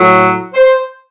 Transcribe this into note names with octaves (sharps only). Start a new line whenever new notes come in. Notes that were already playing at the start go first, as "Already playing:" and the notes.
Already playing: A2 F#3
C5